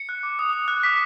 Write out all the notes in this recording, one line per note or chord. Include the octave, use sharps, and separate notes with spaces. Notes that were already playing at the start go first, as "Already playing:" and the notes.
Already playing: C#7
F#6
D6
D#6
D#6
F#6
D6 B6